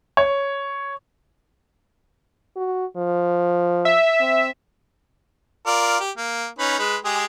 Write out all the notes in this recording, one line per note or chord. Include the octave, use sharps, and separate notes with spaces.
C#5
F#4
F3
E5
C4
F4 A#4 D5
G4
A#3
C#4 D#4 B4
G#3 B4
G#3 G4 G#4